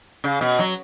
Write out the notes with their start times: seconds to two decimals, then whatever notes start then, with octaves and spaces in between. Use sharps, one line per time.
0.24 C#3
0.41 B2
0.59 F#3